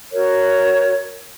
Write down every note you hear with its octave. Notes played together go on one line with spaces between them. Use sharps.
F#4 A#4 C#5